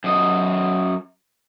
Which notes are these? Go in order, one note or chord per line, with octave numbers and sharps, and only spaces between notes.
F#2 D#5